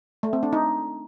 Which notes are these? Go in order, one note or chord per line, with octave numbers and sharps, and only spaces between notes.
A3
C4
D4
D#4